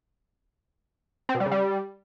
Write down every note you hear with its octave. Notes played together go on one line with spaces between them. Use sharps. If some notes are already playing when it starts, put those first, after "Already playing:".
C4
B2
G3
C#3
G3